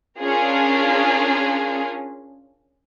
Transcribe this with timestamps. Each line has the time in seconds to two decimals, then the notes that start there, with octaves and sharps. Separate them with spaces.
0.19 C#4 D4 F4 G#4 A#4